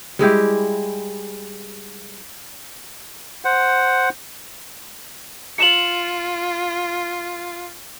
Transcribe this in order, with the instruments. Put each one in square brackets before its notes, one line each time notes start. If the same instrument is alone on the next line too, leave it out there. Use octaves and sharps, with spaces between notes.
[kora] G3 G#3 E4 G4
[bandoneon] C5 F#5
[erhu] F4 [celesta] C#7 E7 F#7